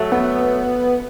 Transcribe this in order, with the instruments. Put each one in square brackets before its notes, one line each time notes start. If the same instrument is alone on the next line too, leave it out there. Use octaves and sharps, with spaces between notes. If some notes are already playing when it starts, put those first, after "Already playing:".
Already playing: [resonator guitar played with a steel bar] F#3 A3
[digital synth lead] B3